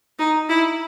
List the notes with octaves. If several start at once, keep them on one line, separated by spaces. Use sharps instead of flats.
D#4
E4